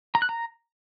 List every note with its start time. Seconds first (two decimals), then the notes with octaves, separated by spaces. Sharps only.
0.15 A#5
0.22 F#6
0.29 A#5